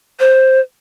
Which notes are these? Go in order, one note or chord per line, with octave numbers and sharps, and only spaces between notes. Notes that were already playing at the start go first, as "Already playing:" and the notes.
C5